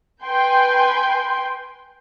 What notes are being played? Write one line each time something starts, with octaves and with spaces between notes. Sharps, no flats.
B4 G5 G#5 C6 G6